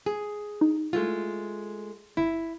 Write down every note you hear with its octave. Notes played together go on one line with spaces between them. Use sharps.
G#4
D#4
G#3 A3 F4
G1 E4